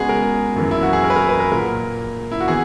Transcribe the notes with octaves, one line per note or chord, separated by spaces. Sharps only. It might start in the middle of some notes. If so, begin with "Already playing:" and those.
Already playing: C#3 G#3 B3 F#4 G#4
A#4
F#2 E3 A#3
E4
F#4
G#4
A#4
B4
A#4
B4
A#4
A#2 A#3 A#4
E4
F#4
E3 B3 G#4